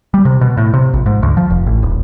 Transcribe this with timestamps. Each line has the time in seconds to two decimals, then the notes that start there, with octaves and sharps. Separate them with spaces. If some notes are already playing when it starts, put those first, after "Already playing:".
0.14 G3
0.25 C3
0.41 B2
0.57 A2
0.74 C3
0.94 A#1
1.06 G#2
1.23 D2
1.37 F3
1.50 F1
1.66 A1
1.83 D#1